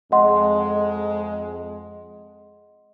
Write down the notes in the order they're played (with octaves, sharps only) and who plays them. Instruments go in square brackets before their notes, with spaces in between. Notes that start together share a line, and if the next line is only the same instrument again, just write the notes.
[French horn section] F2 G#3 [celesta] D#5 F#5 C6